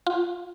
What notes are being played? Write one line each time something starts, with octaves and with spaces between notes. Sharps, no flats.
F4